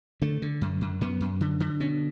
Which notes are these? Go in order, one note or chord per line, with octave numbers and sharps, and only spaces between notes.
D3 A3
D3
F#2
F#2
F#2 B3
F#2
D3
D3
B2 C#4